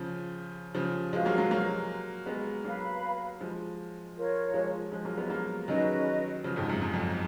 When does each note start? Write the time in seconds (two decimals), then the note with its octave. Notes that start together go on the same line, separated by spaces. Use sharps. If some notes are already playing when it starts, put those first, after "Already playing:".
Already playing: C#3 F3
0.75 C#3 F3
1.13 F3 G#3 F#4 B4 F5
1.25 F#3 A#3
1.38 F#3 A#3
1.51 F#3 A#3
2.26 G#3 B3
2.64 F#3 A#3 B4 F5 B5
3.41 F3 G#3
4.17 F4 A#4 C#5
4.54 F3 G#3
4.92 F3 G#3
5.05 F#3 A#3
5.17 G#3 B3
5.30 F#3 A#3
5.67 D#3 F#3 C#4 G#4 B4 D#5
6.44 C#3 F3
6.56 F2 G#2
6.70 F#2
6.82 F#2
6.94 F2